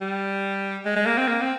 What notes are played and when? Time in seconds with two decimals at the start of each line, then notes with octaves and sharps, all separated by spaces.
0.01 G3
0.85 G#3
0.96 G#3
1.06 A#3
1.17 C4
1.28 A#3
1.42 C4